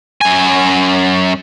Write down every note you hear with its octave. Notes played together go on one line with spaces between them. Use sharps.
F#2 G#5